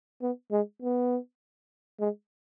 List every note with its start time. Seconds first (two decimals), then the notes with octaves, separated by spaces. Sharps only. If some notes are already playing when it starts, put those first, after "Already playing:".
0.22 B3
0.52 G#3
0.82 B3
2.00 G#3